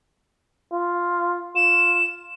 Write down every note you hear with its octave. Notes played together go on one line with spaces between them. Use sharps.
F4
F4 E7